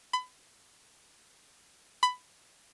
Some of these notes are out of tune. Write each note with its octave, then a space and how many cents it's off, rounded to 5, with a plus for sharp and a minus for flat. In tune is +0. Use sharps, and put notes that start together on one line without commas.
B5 +30
B5 +15